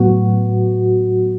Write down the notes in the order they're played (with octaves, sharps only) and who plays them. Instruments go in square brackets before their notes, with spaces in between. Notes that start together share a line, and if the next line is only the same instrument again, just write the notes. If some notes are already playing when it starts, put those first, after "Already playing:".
Already playing: [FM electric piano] A2 F#3 B3 F#4